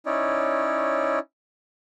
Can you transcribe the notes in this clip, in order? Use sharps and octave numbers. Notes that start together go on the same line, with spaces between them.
C#4 D#4 E4 C#5 D5